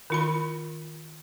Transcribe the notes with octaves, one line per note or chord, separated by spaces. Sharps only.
D#3 F4 B5